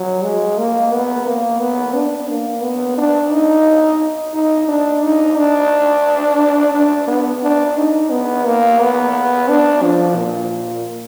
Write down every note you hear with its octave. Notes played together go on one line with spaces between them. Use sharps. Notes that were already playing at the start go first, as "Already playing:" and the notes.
Already playing: F#3
G#3
A#3
B3
A#3
B3
D4
A#3
B3
D4
D#4
D#4
D4
D#4
D4
D4
B3
D4
D#4
B3
A#3
B3
D4
F3
A#2